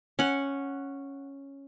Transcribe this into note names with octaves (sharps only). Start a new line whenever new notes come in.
C#4 F#5